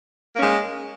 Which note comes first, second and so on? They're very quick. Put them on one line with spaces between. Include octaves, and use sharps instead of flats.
A#3 C#4 G#3